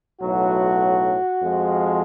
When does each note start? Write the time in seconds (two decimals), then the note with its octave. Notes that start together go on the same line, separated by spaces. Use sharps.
0.21 B1 A2 F#3 F#4
1.42 F2 F3 G#3